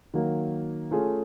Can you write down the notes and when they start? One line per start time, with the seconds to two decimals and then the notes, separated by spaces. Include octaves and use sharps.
0.14 D#3 F#3 A#3
0.91 A3 C#4 F4 G#4